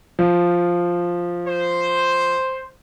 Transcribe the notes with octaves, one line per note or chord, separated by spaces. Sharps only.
F3
C5